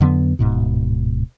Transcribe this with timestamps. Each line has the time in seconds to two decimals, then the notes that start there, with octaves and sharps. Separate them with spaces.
0.01 F2 D3 F#3 B3
0.39 D1 G#2 B2